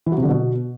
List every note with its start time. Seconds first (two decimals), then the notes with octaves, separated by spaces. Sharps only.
0.06 E3
0.12 F#3
0.17 C3
0.23 D3
0.28 B2